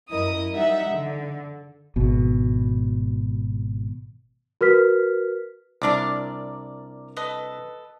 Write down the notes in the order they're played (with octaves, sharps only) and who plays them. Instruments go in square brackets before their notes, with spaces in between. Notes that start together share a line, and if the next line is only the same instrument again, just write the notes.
[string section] F#2 E4 A#4 D#5 D#6
G3 D#4 E5 F#5
D3
[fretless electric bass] G#1 B2
[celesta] F#4 A#4 B4 F6 B6
[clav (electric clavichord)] C2 D4 [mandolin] A#4 D5 D6
[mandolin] A4 B4 D#5